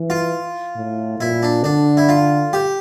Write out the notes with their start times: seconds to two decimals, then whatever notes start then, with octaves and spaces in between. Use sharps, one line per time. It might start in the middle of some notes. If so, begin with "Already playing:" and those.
Already playing: E3
0.10 F4
0.76 A2
1.19 A#2 E4
1.43 D4
1.64 D3 D4
1.97 E4
2.09 F4
2.53 G4